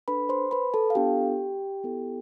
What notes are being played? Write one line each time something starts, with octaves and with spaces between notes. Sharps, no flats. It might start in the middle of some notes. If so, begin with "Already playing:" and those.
D4 A4 B4 B5
C5 C6
B4 B5
A4 A5
F5
B3 D4 F4 G4 A4 G5
B3 E4 A4